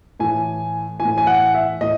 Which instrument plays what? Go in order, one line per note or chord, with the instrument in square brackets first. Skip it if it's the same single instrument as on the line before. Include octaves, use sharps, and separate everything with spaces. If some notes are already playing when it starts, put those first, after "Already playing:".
[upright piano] A2 E3 G#5
A2 E3 G#5
G#5
F#5
E5
A2 D#5